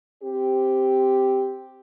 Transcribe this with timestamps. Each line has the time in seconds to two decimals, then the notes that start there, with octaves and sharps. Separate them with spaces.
0.23 C4 G4